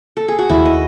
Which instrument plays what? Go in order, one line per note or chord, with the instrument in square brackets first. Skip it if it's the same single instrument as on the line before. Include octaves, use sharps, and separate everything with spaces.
[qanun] A4
G#4
F#4
[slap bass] D#2 D#3 A3 [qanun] E4
[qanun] D#5